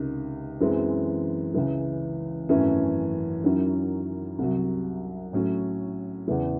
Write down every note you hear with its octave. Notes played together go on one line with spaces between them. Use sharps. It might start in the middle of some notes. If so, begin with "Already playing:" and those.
Already playing: C#2 C3 D#3
F#2 E3 G#3 C4
C#2 C#3 E3
G#1 F#2 E3 A3 C#4
F#2 D#3 F#3 C#4 E4
C2 C3 F#3
A2 F#3 C#4
E2 C#3 E3